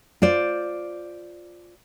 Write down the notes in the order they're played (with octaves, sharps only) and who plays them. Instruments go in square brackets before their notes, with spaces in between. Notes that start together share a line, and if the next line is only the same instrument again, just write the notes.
[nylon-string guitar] F4 C5 D5